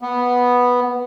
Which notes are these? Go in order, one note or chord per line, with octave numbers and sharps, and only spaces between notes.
B3